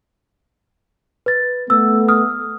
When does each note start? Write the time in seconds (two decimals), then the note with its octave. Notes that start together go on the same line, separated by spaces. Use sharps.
1.26 B4 A6
1.70 A3 B3 E6
2.08 D#6 F6